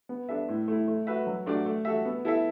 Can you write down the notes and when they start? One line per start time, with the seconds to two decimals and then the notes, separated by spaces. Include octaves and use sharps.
0.09 B3
0.29 D4 A4 E5
0.48 A2
0.68 A3 E4
0.88 A3
1.07 F#4 B4 E5
1.27 F#3
1.46 A3 D4 F#4 D5
1.66 A3
1.85 F#4 A4 E5
2.05 B3
2.25 E4 A4 E5